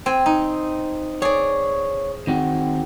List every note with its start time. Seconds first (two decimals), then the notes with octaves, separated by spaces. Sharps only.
0.06 C4 G#5
0.26 D#4
1.22 G#4 C#5 D5
2.27 D#3 C4 F#4